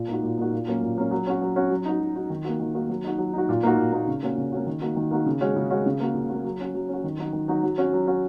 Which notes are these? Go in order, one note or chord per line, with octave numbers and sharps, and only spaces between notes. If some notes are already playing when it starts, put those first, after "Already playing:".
Already playing: A#2
A#3 D#4 F#4
A#2
A#3 D#4 F#4
A#2
F#3 A#3 C#4
A#2
F#3 A#3 C#4
F#3
C#4 F#4
F#3
C#4 F#4
F#3
D#4 F#4
F#3
D#4 F#4
D#3
A#3 D#4 F#4
D#3
A#3 D#4 F#4
F#3
D#4 F#4
F#3
D#4 F#4
A#2
A#3 D#4 F#4
A#2
A#3 D#4 F#4
C#3
A#3 C#4 F#4
C#3
A#3 C#4 F#4
D#3
A#3 D#4 F#4
D#3
A#3 D#4 F#4
C#3
G#3 C#4 F#4
C#3
G#3 C#4 F#4
C#3
A#3 F#4
C#3
A#3 F#4
F#3
C#4 F#4
F#3
C#4 F#4
D#3
F#3 D#4 F#4
D#3
F#3 D#4 F#4
F#3
C#4 F#4
F#3
C#4 F#4